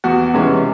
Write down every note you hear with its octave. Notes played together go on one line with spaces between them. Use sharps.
E2 F#4
C3 E3 G#3 C#4